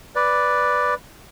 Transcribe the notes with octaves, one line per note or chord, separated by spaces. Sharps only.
B4 D5